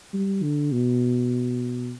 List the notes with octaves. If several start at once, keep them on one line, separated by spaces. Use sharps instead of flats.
G3
D3
B2